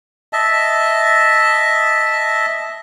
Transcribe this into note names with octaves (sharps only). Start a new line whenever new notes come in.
D#5 E5 A5